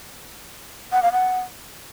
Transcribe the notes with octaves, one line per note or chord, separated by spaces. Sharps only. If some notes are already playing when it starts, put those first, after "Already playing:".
F#5
F5
F#5